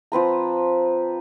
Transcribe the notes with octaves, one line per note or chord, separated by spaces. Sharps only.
F3 C4 B4 A#5